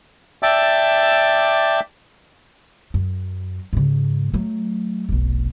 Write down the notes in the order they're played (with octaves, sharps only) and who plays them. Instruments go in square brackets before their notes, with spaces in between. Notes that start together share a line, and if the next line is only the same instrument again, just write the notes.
[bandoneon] D5 E5 G5 A5 D6 E6
[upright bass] F#2
G#2 C#3
F#3 A3
F1 B1